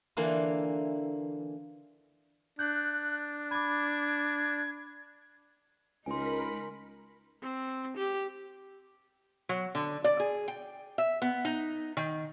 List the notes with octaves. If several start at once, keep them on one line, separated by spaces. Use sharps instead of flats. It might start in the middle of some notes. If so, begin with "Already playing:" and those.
D3 E3 A#3 F4
D4 F#6 G6
B5 D6 G#6
C#2 G#3 D#4 A#4 G#5 B5 C6
C4
G4
F#3
D3
D5
G#4
G5
E5
B3
D#4
D#3